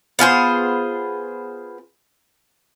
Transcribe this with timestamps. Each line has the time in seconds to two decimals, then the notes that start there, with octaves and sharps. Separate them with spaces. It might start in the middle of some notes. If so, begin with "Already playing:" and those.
0.19 B3 F4 G#4 C5